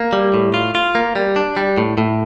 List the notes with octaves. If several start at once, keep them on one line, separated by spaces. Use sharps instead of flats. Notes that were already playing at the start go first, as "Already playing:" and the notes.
Already playing: A#3
G3
A2
F4
F4
A#3
G3
D4
G3
A2
A2